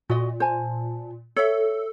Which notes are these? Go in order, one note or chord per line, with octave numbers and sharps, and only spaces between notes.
A#2 F#4 D#5
C5 G#5 A5
A4 C#5 E5